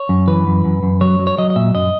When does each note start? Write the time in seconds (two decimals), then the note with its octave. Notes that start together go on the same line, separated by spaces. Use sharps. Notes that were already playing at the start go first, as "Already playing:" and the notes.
Already playing: C#5
0.09 F#2
0.28 E3 B4
0.47 F#2
0.64 F#2
0.83 F#2
1.01 F#3 C#5
1.19 F#3
1.27 C#5
1.38 F#3 D#5
1.50 D#5
1.56 A#2 E5
1.74 F#2 D#5